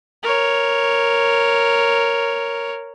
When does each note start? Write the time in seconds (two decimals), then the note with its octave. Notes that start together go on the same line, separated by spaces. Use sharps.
0.23 A#4 C#5